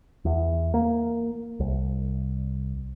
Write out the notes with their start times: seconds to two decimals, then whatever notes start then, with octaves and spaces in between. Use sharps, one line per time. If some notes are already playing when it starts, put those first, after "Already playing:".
0.25 E2
0.74 A#3
1.60 C2